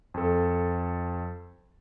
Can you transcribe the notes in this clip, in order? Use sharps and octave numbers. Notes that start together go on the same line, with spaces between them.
F2 A4